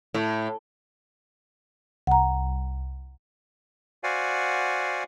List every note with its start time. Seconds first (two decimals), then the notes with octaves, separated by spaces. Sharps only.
0.14 A2
2.07 C2 F#5 A#5
4.04 F#4 C5 D5 F5 F#5 G#5